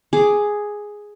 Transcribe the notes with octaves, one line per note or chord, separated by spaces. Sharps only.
G#4 D6